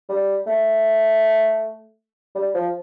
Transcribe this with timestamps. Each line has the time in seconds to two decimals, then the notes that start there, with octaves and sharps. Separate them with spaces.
0.09 G3
0.47 A3
2.35 G3
2.54 F3